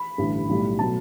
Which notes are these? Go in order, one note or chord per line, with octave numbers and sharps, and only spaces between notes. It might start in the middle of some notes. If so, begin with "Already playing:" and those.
Already playing: B5
A1 G2 D3
B1 A2 G3
B2 F#3 A3 A5